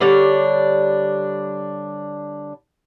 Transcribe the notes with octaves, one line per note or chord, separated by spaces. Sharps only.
D3 G3 D4 C#5